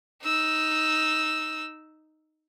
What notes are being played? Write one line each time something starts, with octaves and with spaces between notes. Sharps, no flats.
D#4 E6